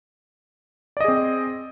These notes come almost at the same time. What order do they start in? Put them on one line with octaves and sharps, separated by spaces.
D5 D#5 G#4 C4